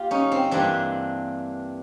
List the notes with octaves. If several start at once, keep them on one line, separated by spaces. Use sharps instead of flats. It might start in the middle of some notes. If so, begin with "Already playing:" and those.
Already playing: A#3 F4 G4
C#4 D#4
C4
G2 E3 G3 A#3 C4 D4